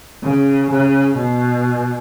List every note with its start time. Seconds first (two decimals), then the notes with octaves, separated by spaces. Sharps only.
0.23 C#3
0.71 C#3
1.17 B2